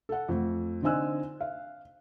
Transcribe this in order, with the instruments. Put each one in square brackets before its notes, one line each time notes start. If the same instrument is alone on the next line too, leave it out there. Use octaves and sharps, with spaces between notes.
[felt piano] A4 F#5
F2 A3
D3 C4 D#4 G#5 E6 F#6
F5